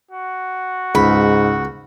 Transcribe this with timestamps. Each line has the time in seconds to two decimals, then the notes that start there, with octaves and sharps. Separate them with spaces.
0.11 F#4
0.95 C#2 G#2 B5